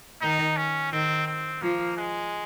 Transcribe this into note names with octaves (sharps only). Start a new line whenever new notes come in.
D#3 D#4
C#4
D#3 C4
C4
F3 A#3
G#3